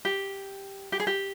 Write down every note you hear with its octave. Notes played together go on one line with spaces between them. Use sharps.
G4
G4
G#4
G4